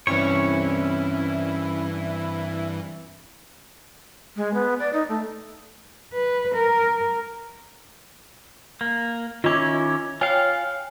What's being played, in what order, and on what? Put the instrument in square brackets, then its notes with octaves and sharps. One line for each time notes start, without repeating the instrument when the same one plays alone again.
[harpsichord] C2 C#6 [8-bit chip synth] G2 E3 [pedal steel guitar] C#4 C#5 [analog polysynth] E4
[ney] G#3
B3
D5
D#4
A3
[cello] B4
A#4
[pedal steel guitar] A#3
[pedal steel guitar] D#3 C#4 E4 [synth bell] F4 D6
[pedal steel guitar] F4 F5 [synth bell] C#5 G5 G#5